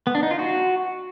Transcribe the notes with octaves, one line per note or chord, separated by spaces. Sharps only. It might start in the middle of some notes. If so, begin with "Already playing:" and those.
B3
D4
D#4
F4
F#4